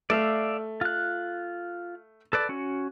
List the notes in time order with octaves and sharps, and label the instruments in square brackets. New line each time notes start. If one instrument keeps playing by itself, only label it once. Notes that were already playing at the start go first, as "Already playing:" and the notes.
[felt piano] A3 [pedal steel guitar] D5 E5 F5
[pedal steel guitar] F4 F#6
A4 B4 D5
C#4 F#4